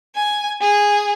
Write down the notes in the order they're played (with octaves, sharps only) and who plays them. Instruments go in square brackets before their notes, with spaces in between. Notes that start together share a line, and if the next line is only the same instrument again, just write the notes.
[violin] G#5
G#4